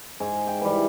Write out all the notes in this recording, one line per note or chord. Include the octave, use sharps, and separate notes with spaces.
G#2 G#5
G5
E3 G3